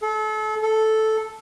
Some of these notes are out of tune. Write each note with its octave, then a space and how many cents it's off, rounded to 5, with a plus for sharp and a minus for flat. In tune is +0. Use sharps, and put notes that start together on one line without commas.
A4 -35
A4 -5